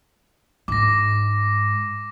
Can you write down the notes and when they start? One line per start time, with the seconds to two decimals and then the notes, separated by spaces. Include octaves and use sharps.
0.68 G#2 D6 A#6